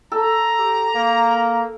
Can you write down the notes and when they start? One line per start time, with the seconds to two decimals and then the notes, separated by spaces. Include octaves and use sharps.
0.12 A4 A#5
0.59 G4
0.95 A#3